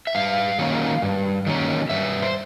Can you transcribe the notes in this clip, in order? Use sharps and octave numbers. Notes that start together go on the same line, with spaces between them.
E5
G2 F5
D#3 F#3 A#3 C#4
G2
D#3 F#3 A#3 C#4
G2 E5
C5